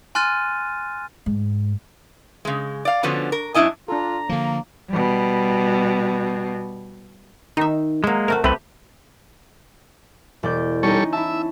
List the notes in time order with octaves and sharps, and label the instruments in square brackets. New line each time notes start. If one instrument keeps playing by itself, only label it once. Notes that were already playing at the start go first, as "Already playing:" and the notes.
[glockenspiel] G#5 C6 F6 F#6 A6 D#7
[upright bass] G#2
[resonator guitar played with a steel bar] C#3 G#3
D5 F5
D3 F3 B3 C#4 F#4
A#4
F#2 D4 E4 D#5 G#5
[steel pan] D4 A4 [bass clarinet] F4 [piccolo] A#5
[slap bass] D3 F3 [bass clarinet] A#3
[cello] B2 G3
[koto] D#3 E5 [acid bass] D#4
[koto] F#3 E5 [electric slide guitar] G#3 A#3
[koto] C3 A3 F#4 [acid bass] A#4
[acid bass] C2 [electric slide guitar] A3 C4 B4 [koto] G4
[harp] E1 D5 G6
[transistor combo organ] G3 A4 C#5 [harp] C#4 D#4
[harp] E4 A5 [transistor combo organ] E5